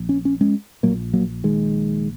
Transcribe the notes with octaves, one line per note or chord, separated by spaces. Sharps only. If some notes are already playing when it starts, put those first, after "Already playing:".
Already playing: A#1
C#4
C#4
G#3 C#4
A#1 A#2 F#3 A#3
F#3 A#3
D#3 G#3